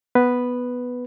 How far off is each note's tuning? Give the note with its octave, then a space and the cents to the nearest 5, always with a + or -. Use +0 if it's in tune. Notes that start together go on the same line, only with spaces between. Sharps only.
B3 +0 B4 +0